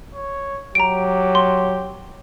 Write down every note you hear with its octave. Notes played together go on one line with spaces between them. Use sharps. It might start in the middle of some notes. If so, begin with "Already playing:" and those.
C#5
F#3 G4 A#5 D7
C6